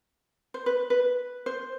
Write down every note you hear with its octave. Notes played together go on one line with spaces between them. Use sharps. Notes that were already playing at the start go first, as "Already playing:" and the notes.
C5
B4
B4
C5